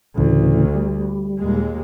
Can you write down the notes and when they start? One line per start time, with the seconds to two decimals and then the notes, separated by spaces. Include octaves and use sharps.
0.18 D2 A2 C#3 E3
0.75 G3
1.39 D#2 A#2 G#3